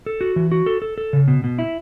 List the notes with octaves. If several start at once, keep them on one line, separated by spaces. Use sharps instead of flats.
A4
F#4
E3
F#4
A4
A4
A4
C#3
B2
B2
E4